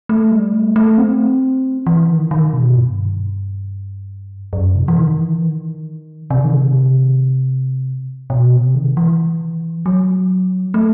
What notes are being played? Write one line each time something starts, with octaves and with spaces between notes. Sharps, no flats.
A3
G3
A3
A3
C4
E3
D#3
D#3
B2
G2
F#2
C3
E3
D#3
E3
D#3
C3
D#3
C3
B2
C3
D#3
E3
F#3
A3